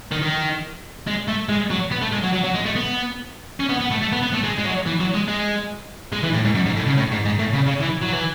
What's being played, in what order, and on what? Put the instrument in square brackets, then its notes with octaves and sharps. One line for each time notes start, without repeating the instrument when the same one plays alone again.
[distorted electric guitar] D#3
D#3
G#3
A3
G#3
F#3
B3
A3
G#3
F#3
F#3
F#3
G#3
A3
B3
C#4
B3
B3
A3
A3
B3
B3
A3
G#3
G#3
F#3
E3
F#3
G#3
G#3
G#3
E3
A2
G#2
F#2
G#2
A2
C#3
A2
G#2
G#2
A2
C#3
C#3
E3
F#3
E3